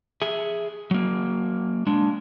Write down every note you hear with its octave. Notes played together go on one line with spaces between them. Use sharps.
G#4 E5
F#3 A#3
G#3 D4